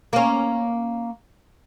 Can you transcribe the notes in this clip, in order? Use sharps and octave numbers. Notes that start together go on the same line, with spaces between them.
A#3 C#4